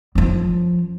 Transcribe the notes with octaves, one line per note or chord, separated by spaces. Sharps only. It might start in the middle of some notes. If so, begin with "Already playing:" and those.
F#2 F3